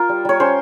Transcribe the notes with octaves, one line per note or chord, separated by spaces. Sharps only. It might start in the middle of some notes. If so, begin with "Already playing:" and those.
Already playing: F4 A#4
G3
G3 C#5
C#4 C5